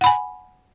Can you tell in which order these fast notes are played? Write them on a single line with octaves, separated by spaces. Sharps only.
F#5 B5 G#5